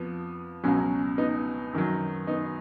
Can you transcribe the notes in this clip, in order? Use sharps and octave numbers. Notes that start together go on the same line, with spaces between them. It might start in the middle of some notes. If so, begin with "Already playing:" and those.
Already playing: F2 F3 B3
C#2 B2 F#3 C#4
B3 D#4
F#2 D#3 F#3
B3 D#4